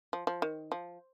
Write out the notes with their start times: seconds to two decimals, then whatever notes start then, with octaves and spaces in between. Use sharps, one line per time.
0.13 F3
0.27 F3
0.42 D#3
0.72 F3